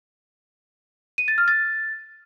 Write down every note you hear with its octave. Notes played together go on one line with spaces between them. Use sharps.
D#7
A6
F6
A6